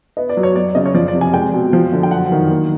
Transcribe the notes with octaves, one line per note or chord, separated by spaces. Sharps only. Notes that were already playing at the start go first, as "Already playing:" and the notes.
B3 D#5
D5
F#3
C#5
F#3 D5
C#3 D#5
C#5
F3 D5
D5
C3
G#5
G#3 G5
B2
F3
D3
G5
F#3 F#5
D#3
A#3